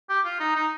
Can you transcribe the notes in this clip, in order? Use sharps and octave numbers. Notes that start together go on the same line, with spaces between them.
G4
F4
D#4
D#4